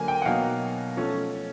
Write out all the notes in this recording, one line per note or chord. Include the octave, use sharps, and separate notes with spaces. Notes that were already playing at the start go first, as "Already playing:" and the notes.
Already playing: D3 F#3 A#3 G#5
G5
F#5
B2 F#3 A#3 D#4 F5
F3 A3 C#4